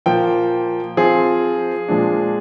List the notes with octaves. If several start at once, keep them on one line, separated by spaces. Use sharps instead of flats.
A#2 F3 A#3 G5
F3 C4 F4 G#4
A#2 F3 G#3 D4